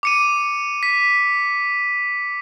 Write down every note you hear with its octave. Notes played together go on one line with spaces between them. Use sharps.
D6 C#7 D#7
B6